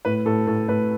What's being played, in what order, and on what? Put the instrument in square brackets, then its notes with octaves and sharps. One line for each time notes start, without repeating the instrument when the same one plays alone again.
[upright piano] A2 [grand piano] B4
[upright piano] A2 [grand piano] A4
[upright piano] A2 [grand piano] A4
[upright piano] A2 [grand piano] B4